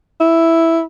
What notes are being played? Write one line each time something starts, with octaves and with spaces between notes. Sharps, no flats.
E4